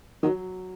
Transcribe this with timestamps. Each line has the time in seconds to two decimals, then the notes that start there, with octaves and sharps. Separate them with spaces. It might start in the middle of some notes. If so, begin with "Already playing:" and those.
0.23 D#3 F#3